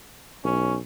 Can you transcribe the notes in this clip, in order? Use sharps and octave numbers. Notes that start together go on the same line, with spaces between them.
B1 C#4